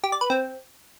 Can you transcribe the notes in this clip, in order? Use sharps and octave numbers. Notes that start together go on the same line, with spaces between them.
G4
D5
B4
C4